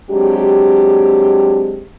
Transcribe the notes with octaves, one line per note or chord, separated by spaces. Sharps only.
F#3 G#3 C4 D4 G4